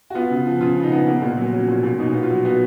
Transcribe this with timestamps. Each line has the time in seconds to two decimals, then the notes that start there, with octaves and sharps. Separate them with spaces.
0.10 F#4
0.15 B3 F4
0.30 C#3
0.46 F3
0.61 C#3 F4
0.77 B3
0.83 D#4
0.92 B3
1.07 A#3
1.22 A#2
1.37 F#3
1.53 F#3 C#4
1.68 A#2
1.83 A#2
1.99 B2 D#4
2.14 B3
2.23 F4
2.31 F#3
2.45 B3 F#4